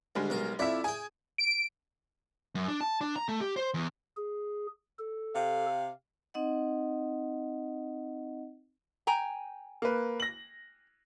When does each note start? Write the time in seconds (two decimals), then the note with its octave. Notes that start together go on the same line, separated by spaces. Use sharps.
0.15 D2 G3 G#3
0.30 B1 A#4
0.59 F2 E4 D5 E5
0.84 G#4 G5 G#5
1.38 D7
2.55 F#2
2.68 D4
2.81 A5
3.01 D4
3.16 A#5
3.28 A3
3.40 G4
3.56 C5
3.74 E2
4.17 G#4
4.98 A4
5.35 C3 G4 F5
6.34 C4 D#4 D#5 F#5
9.07 G5 G#5 A#5
9.82 A#3 B4
10.20 A#6 F#7